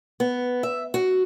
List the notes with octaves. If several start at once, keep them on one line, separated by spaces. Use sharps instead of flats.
B3
E5
F#4